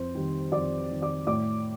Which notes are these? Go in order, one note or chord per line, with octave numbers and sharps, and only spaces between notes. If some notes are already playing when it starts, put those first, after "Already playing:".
Already playing: F2 C5 C6
D#3 G3
F2 D5 D6
D#3 G3
D5 D6
A2 D5 D6